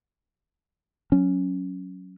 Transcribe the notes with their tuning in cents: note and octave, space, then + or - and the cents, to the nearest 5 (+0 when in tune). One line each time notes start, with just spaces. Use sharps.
F#3 +0 C#4 +0